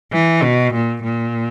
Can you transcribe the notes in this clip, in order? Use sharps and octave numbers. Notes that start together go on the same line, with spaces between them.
E3
B2
A#2
A#2